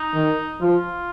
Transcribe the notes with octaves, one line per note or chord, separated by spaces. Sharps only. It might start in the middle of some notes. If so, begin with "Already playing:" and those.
Already playing: D#4
D#3
F3 F4